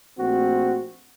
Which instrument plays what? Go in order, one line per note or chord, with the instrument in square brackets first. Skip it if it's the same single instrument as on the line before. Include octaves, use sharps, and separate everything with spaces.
[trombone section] A#1 A3 C4 F#4